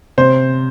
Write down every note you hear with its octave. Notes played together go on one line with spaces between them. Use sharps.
C3 C5